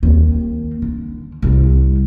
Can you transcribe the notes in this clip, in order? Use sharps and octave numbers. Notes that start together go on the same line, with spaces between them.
D#2 C4
D3
C2 C3